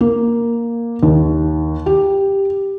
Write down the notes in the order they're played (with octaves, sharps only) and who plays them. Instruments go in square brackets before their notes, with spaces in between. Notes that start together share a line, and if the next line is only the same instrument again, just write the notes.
[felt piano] A#3
D#2
G4